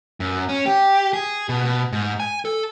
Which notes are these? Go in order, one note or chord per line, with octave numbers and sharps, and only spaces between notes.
F#2
C#4
G4
G#4
B2
B2
G#2
G#5
A4